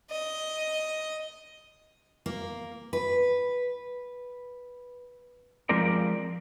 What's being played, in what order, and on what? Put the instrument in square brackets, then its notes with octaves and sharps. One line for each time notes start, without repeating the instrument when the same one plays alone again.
[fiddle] D#5
[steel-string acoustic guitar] A#3
B4
[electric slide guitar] F3 G#3 C4 F4 A#4 D5